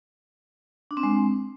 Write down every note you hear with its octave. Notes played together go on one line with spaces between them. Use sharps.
D4
C4
G#3